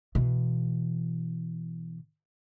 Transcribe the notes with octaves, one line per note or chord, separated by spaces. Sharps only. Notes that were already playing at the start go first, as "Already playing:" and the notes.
B2 E3